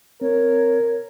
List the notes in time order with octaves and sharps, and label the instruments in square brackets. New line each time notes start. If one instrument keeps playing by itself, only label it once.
[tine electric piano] C4 [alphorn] A#4 [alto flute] C#5